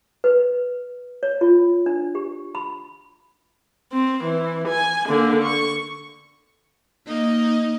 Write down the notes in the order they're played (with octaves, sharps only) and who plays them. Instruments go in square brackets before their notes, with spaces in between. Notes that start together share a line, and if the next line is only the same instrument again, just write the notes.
[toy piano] B4
C#5
F4
D4
G4
B5
[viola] C4
E3
G#5
D3 A#3
C#6
[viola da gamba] A#3 D#4 D#5